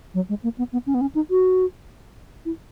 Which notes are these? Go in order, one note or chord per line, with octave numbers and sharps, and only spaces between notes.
F#3
G#3
A#3
B3
B3
C#4
B3
C#4
D#4
F#4
E4